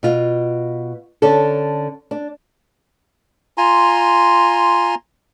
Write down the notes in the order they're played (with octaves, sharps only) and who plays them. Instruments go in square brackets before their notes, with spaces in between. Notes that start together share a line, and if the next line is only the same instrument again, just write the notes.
[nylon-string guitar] B2 F4
D3 C#4 D4 A4
D4
[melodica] F4 G#5 A#5 C6